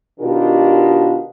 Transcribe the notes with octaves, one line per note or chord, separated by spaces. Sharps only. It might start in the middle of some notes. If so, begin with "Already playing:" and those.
B2 D#3 D4 F4 G4 A#4